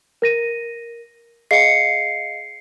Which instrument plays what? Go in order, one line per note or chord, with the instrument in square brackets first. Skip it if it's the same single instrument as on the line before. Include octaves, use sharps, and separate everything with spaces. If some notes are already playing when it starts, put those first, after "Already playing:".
[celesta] A#4 A#6 D#7
[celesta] G#4 D#5 F5 [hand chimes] C7 C#7